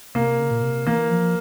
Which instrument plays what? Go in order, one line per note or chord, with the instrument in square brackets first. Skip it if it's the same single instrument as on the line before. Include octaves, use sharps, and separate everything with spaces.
[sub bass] C3 [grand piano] A#3
[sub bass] C#3
A#2
C3
[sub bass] E3 [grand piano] A#3
[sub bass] F3